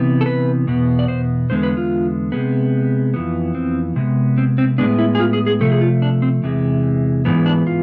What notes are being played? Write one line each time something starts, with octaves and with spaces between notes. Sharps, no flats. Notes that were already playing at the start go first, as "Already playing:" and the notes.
Already playing: C3 E3 B3
A4
B4
E2 B2 B3
D5
C5
E2 D3 G#3 B3 C5
B4
F4
C3 G#3 B3
F2 E3 B3
C4
C3 G#3 B3
C4
C4
A2 G#3 B3 D4
E4
G#4
F4
G#4
G#4
C3 F3 A3 A4
G#4
F4
D4
C4
E2 C3 E3 G#3
G#2 E3 B3
D4
F4